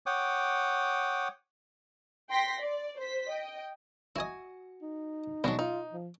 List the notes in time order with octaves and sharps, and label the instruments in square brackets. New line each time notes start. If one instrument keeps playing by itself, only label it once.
[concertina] C#5 F#5 G5 D6 D#6
[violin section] G5 C6 A#6 B6
D5
C5 B6
D#5 G5
[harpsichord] E4 D#5 [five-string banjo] F#4 G#5
[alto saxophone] D#4
[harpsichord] B2 F#3 [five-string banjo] G#3 D4 F#4
[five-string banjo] D#4 [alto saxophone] F4
[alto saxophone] F3